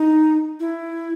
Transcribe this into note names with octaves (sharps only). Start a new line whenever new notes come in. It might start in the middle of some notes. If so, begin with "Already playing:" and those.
Already playing: D#4
E4